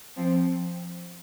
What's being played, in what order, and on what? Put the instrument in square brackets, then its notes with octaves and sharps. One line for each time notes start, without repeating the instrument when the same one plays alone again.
[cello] F3 [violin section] C4